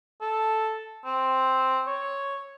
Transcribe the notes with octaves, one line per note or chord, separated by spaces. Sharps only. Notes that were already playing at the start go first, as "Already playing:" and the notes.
A4
C4
C#5